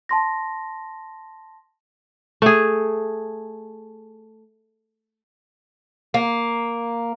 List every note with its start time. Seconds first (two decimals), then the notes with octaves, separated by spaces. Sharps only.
0.09 A5 C6 A#6
2.42 A3 G#4
6.14 A#3